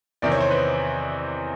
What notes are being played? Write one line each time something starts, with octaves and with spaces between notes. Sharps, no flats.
E2 C3 D#3 D5
C#5
C5
B4